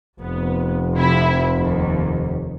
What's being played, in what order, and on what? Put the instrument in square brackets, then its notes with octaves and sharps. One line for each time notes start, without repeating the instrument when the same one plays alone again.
[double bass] F1 [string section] B3
[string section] C3 F3 E4
D#2